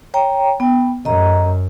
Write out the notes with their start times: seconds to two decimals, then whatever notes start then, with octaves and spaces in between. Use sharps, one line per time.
0.14 C#5 G5 A#5
0.60 B3 G5
1.05 F#2 D#5 A#5